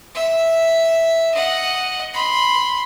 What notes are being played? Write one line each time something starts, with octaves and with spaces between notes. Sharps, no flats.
E5
D#5 F#5
B5 C6